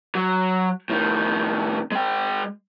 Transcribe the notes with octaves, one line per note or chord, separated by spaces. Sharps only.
F#3
A2 D#3
G#3 G5